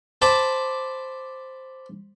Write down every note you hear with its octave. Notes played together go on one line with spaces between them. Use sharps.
C5 A5 B5 D6